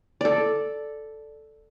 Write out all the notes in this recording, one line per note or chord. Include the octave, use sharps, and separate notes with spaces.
A4 D5